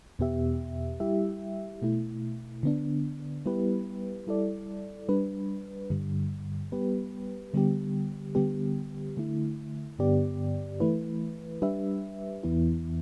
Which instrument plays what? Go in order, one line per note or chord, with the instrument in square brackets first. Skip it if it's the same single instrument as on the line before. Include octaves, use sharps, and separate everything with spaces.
[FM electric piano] E2 B2 B3 G4 E5
G3 E4 G4 E5
B2 A3 E4
D3 B3 D4
G3 B3 E4 G4 B4
G3 E4 A4 D5
G3 D4 B4
G2 D3 G3
G3 B3 G4 B4
D3 G3 B3 G4
D3 G3 B3 G4
D3 A3 E4
G2 D3 B3 G4 D5
E3 A3 E4 B4
G3 D4 G4 B4 E5
E2 E3 B3 E4